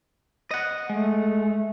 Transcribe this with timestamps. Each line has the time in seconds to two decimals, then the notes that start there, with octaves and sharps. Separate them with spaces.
0.51 D#5 F#5
0.90 G#3 A3